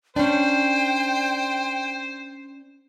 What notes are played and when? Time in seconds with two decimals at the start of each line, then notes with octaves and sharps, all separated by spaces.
0.16 C#4 D4 C5 G5